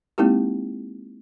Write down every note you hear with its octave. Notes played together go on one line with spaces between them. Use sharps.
G#3 A#3 C4 D#4 E4 G4